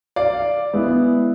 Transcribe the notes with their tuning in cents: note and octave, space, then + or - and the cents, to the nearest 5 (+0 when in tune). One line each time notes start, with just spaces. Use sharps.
D5 +0 F5 +0
G#3 +0 B3 +0 E4 +0